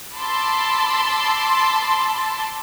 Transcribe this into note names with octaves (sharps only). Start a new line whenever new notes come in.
A5 B5 C6 D6 E6 A6